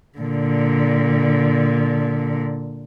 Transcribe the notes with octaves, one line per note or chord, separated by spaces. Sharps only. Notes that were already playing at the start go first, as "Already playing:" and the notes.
A#2 D3